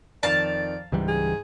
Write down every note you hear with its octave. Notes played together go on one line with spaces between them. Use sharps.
F2 D#3 D5 F5 A5
C#2 G#2 E3 G3
G#4